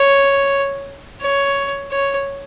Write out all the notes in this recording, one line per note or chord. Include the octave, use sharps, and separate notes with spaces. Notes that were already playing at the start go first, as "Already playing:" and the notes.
Already playing: C#5
C#5
C#5